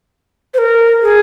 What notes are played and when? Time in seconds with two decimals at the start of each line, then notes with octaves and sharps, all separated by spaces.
0.54 C5
0.58 A#4
1.02 G#4